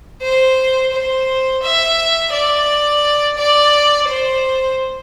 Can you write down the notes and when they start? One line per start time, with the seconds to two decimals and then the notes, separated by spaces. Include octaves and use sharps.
0.22 C5
0.93 C5
1.63 E5
2.32 D5
3.38 D5
4.08 C5